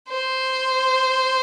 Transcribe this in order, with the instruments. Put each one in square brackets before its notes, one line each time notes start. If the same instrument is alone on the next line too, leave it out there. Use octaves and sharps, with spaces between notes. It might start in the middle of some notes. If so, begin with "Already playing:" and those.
[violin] C5